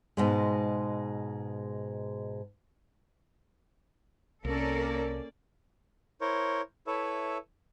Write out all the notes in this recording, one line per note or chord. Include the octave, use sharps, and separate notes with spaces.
G#2 B2 G#3
C2 A#3 C#4 A4 A#4 D5
E4 A#4 C5 C#5
E4 A4 B4 C#5 E5